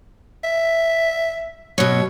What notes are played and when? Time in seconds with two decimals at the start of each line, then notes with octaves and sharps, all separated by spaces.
0.44 E5
1.78 B2 F#3 C#5